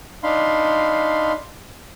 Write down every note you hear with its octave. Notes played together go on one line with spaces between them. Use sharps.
D4 D#4 F5 B5 C6